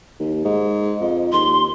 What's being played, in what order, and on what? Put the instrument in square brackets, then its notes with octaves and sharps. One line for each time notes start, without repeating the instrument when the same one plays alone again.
[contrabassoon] D#2
G#2
F2
[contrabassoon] D#2 [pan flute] C6